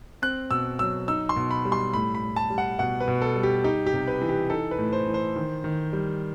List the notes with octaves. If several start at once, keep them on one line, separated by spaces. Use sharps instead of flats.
C4 F#6
B2 E6
F#3 E6
D#4 E6
C6
B2
B5
G3
C6
A2 B5
B5
A2
A5
G3
F#5
B2 F#5
B4
B2
A4
G3
G4
D#4 G4
G4
C3
B4
E3
G4
D#4 A4
B4
A2
C5
E3
C5
D#3
D#3
G3